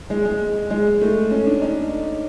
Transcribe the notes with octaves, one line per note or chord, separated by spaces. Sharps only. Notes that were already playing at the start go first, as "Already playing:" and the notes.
G#3
G#3
G#3
A3
C#4
D4
D#4